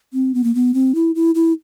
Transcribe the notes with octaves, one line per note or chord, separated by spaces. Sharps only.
C4
B3
A#3
B3
C4
E4
E4
E4